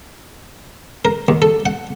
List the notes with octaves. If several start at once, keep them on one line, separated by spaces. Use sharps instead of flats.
A#4
D#2
A4
F#5